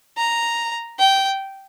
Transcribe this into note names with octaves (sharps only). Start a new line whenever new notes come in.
A#5
G5